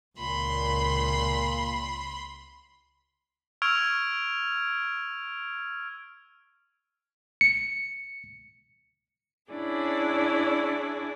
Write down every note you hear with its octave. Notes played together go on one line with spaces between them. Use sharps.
C#2 A#2 B5 C6
C#6 E6 F6 G#6 D7 F7
C#7
C#4 D4 E4 G#4 D5